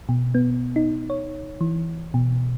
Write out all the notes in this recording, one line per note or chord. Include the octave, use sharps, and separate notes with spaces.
B2
B3
D#4
C#5
E3
B2